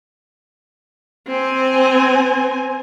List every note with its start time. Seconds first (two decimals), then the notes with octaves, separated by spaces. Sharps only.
1.27 C4 G#5